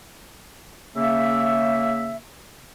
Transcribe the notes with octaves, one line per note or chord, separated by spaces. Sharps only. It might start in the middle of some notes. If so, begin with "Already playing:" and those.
C#3 A#3 E5